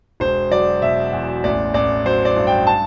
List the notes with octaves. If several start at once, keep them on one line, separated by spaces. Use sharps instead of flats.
E1 C5
F#3 D5
B2 E5
E2
A1 D5
A1 D5
F#3 C5
D5
G2
G5
A5